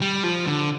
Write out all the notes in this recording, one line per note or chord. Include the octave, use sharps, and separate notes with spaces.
G3
F3
D3